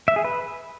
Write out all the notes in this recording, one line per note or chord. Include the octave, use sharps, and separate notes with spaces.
E5
G#4
B4